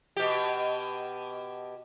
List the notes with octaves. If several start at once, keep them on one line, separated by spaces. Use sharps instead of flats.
B2 G4